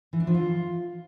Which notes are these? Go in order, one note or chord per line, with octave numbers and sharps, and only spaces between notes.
E3
D4
F3
F4